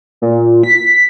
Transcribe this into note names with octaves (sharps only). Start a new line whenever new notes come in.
A#2
B6